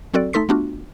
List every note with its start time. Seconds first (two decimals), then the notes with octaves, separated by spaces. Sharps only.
0.14 F#3 C4 F#4 A4 D5
0.33 A3 D#4 A4 C6 B6
0.49 A3 B3 D4 F4 F#4